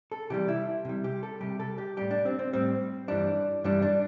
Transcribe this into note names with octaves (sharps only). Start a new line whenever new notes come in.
A4
C3 E3 G3 G4
E4
C3 G3
G4
A4
C3 G3 G4
A4
G4
A2 G3 G4
D4
C4
C4
A2 G3 C4
G2 E3 G3 D4
G2 E3 G3 D4
D4